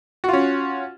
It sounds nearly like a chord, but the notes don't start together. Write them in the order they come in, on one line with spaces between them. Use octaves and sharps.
F#4 F4 C#4